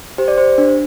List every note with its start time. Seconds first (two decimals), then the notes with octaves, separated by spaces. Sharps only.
0.18 G4 C5
0.28 D5
0.38 G4 C5
0.58 D4